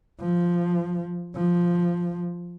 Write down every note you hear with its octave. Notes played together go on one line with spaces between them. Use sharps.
F3
F3